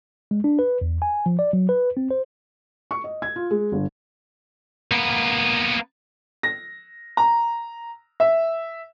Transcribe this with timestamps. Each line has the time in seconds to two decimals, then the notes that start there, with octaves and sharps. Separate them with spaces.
0.31 G#3
0.44 D4
0.59 B4
0.81 E2
1.02 G#5
1.26 F3
1.39 D5
1.53 F#3
1.69 B4
1.97 C4
2.11 C5
2.91 C#6
3.04 D#5
3.22 G#6
3.36 F4
3.51 G#3
3.72 G1
4.91 A#3 B3
6.43 A#6
7.17 A#5
8.20 E5